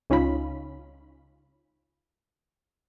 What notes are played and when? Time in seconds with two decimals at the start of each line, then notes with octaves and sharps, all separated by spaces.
0.10 C#2 C#4 D#4 F4 B5